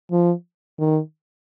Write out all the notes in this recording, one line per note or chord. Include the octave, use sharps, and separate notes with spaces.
F3
D#3